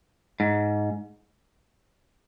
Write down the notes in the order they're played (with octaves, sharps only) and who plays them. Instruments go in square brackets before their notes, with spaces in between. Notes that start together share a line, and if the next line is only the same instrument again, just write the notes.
[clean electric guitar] G#2